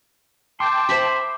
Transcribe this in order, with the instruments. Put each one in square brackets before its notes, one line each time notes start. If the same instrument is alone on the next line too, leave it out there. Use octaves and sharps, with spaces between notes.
[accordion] G5 A5 [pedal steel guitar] C6 [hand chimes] D6 G6
[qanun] C5 E5 B5